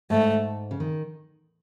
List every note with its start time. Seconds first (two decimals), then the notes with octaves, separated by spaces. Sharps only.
0.10 G#2 A3
0.71 C#3
0.80 D#3